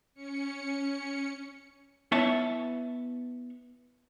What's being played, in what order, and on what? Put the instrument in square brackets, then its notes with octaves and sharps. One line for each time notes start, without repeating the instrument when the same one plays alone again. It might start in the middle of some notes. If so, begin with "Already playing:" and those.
[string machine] C#4 C#7
[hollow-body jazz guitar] B3 E4 C#5 E5 F#5 A5